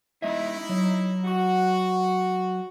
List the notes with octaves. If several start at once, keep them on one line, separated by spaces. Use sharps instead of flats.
G#3 D#4 E4 D#5 E5
F#3
F#4